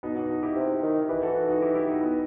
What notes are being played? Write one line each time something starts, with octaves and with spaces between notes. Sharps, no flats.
B2 B3 D#4
D#4 F#4
D#4 F#4
E4 G4
C3
D#3
E3 G4 B4
F#4 A4
D#4 F#4
D#4 F#4
E4 G4
E4 G4
D#4 F#4
B3 D#4